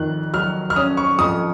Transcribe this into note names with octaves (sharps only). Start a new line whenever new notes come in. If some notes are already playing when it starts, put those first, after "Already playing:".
Already playing: F2 D#3 F#6
F#3 F6
F6
C#4 D#6
C#6
F2 D#6